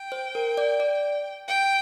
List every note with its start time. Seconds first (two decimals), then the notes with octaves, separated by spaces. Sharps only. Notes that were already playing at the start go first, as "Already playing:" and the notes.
Already playing: G5
0.12 C5
0.35 A#4
0.58 D5
0.80 D5
1.48 G5